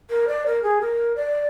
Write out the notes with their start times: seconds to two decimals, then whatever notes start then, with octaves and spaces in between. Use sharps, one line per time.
0.10 A#4
0.28 D5
0.46 A#4
0.63 G#4
0.81 A#4
1.16 D5